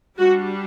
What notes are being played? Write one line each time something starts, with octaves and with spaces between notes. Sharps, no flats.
G3 D4 F#4